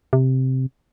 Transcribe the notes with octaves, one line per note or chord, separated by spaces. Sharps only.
C3